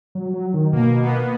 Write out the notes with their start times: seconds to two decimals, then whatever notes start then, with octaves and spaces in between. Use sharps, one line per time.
0.15 F#3
0.34 F#3
0.54 D#3
0.72 B2 A#3
1.01 B3